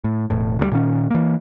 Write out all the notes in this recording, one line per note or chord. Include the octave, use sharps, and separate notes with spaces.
A2
E1 A2
D2 B2 G3
A#2 D#3 C#4
E3 A#3